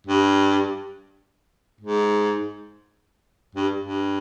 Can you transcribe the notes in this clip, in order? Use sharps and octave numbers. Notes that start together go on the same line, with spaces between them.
G2
G#2
G2
G2